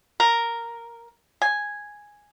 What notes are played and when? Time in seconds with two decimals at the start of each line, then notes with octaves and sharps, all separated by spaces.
0.20 A#4
1.42 G#5